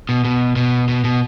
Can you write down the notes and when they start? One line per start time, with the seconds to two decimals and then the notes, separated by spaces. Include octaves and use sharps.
0.09 B2
0.25 B2
0.56 B2
0.89 B2
1.04 B2